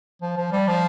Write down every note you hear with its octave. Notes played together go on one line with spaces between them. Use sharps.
F3
F3
G3
F3